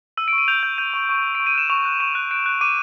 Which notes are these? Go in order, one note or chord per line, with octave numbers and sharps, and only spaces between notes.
E6 D#7
D7
C#6
D#7
G6 F7
G6
G6 D#7
C#6
C#6
C#6
C#6 D7
D#7
F#6 E7
C#6 F7
F#6
C#6 E7
F#6
F#6 D7
F#6
D6 D#7